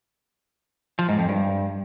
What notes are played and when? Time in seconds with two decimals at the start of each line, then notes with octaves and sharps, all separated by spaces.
0.99 F3
1.09 G#2
1.19 F2
1.29 G2